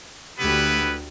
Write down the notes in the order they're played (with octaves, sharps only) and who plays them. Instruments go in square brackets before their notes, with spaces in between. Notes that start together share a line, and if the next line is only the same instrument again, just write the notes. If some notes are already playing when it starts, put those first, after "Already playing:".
[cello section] D2 G4 [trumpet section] B3 E4 B4